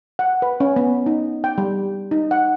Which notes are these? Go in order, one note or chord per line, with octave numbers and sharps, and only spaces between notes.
F#5
B4
C#4
B3
D#4
G5
G3
D#4
F#5